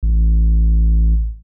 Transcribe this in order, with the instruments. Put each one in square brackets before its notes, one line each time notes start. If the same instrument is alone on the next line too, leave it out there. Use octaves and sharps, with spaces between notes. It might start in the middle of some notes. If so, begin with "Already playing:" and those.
[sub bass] A1